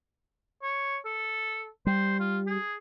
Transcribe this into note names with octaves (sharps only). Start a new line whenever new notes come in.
C#5
A4
G3 C5
F4
G#4